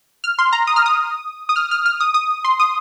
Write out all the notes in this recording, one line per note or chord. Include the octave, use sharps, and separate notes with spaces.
F6
C6
A#5
D#6
F6
D#6
D#6
F6
F6
F6
D#6
D#6
C6
D#6